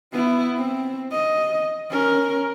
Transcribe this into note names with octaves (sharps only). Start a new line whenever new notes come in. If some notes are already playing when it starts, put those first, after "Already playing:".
B3 E4
C4
D#5
C#4 A#4